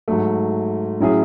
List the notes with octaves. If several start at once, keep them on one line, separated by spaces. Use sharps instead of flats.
G#2 F#3 A3
A2 F#3 C#4 E4 G#4